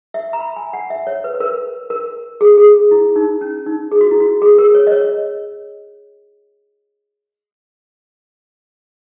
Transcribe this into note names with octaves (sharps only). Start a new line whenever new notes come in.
E5
A#5
B5
G#5
F#5
E5
C#5
B4
B4
A#4
A#4
G#4
G#4
E4
D#4
C#4
D#4
G#4
F#4
E4
F#4
G#4
A#4
C#5
D#5
C#5